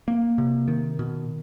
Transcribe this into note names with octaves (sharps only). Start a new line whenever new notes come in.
A#3
C3
D#3
B2